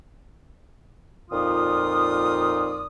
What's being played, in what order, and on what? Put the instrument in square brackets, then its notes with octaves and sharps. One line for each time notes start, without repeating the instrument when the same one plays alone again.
[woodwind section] F2 A#2 D#4 F4 D5 D#6